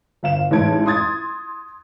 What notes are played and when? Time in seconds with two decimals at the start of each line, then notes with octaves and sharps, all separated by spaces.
0.23 G1 F5 E7
0.51 A1 G#2 A5 G#6 D7
0.86 C6 D#6 G#6 A6